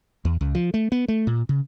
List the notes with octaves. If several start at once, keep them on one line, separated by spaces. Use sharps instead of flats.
E2
C#2
F3
A3
B3
A3
A#2
C#3